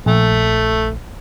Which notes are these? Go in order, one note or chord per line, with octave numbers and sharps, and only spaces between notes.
A#1 A3